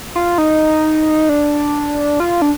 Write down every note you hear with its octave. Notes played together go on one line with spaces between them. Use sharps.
F4
D#4
D4
F4
D4